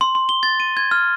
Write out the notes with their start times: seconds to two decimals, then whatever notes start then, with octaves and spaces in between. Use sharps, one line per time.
0.01 C6
0.15 C6
0.29 G7
0.43 A6
0.60 D#7
0.77 G#6
0.91 F6